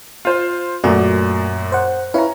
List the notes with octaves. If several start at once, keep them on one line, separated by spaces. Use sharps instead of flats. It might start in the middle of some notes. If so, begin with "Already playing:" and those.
F4 C5
F#2 A#2 A3 F#4 D5
C5 F#5
C#4 E4 B4 F5 A#5